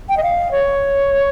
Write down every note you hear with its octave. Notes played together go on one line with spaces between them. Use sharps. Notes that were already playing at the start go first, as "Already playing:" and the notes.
G5
D#5
F5
C#5